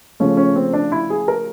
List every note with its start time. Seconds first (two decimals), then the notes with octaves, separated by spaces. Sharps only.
0.20 C#3 F3 A3 C#4
0.37 C#4
0.55 C4
0.73 D4
0.92 E4
1.10 G#4
1.28 A#4